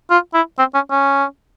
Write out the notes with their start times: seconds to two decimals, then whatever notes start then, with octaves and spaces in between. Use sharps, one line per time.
0.10 F4
0.34 E4
0.59 C4
0.74 C#4
0.90 C#4